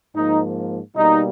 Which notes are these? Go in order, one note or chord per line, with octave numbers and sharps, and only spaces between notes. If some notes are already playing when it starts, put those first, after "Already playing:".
G#2 F3 A#3 D#4
B2 G3 A#3 D#4